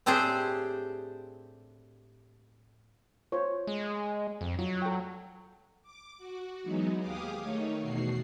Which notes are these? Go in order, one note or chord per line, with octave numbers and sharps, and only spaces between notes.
A2 C4 D4 G4 G#4 C5
F4 C5 C#5
G#3
F2
F#3 F4
A4 G5
D6
F#4
E3 F#3 G#3 B3 D#4
D#2 G4 G#4 F5 D6 D#6
D#3 A3 D#4 C#5
E2 B2 F#4 C7